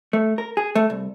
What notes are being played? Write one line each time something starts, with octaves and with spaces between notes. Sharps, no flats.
A3
A#4
G#4
A3
C2